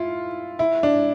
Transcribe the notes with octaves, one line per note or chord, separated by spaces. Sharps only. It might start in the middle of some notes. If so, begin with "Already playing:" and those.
Already playing: E4 F4
E4
D4